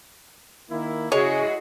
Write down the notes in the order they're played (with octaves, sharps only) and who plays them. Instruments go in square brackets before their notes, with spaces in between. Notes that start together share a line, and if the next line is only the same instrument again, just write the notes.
[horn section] D#3 A#3 E4
[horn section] C#3 G#5 [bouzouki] G#3 [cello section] E4 F#4 G#4 [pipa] C#5